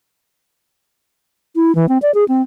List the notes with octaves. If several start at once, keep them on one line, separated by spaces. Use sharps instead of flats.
E4
E3
C4
D5
G#4
C4